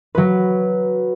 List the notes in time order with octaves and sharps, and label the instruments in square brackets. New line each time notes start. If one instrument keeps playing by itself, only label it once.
[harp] F#3 B4